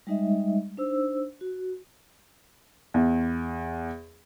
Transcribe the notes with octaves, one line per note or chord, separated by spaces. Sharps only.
G3 G#3 D#4 D#5 E5
D4 D#4 C5 E6
F#4
E2